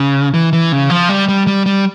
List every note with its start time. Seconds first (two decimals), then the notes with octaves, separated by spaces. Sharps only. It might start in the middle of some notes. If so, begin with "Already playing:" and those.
Already playing: C#3
0.34 E3
0.53 E3
0.72 C#3
0.90 F3
1.09 G3
1.28 G3
1.47 G3
1.66 G3